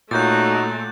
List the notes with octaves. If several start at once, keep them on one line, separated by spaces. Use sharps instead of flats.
A#2 A3 D#4 F#4 C#5 F#6 G6 A6